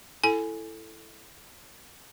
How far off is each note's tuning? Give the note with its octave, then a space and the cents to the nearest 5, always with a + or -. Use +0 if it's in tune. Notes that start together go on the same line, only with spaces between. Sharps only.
E4 +10 A4 +0 G#5 +0